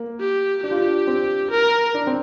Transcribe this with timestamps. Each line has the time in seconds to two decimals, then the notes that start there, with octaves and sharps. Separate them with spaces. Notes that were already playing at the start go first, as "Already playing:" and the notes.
Already playing: A#3
0.20 G4
0.64 D4 G4
0.71 F4
0.79 D4
1.07 C4
1.51 A#4
1.94 D4
2.07 C4